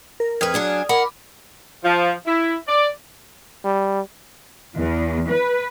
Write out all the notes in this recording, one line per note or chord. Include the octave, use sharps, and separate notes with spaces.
A#4
F2 B4 D#6 F6 G#6
F#3 D4 G#4
A#4 F#5 B5 D6
F3
E4
D5
G3
E2
B4